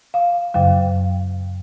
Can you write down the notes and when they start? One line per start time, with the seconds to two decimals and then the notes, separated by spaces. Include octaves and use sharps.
0.14 F5
0.54 F#2 C#3 F#3 F5